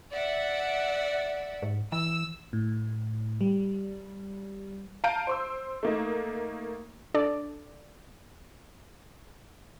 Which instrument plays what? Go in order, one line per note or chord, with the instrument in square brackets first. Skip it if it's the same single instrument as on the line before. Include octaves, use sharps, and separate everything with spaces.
[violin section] D5 E5 F#5
[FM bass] G#2
[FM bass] E3 [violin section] E6
[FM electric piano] A2
G3
[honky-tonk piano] F5 A5 A#5 G6 D7 D#7
C5 C6 E6
A3 A#3 D#4
[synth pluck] D4 A4 D5